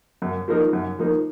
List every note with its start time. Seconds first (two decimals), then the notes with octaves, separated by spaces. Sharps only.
0.22 F#2
0.48 F3 A#3 D#4 A#4
0.73 F#2
0.99 F3 A#3 D#4 A#4